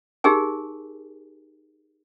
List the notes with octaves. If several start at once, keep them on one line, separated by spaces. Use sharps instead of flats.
D#4 G4 G#4 A#4 G#5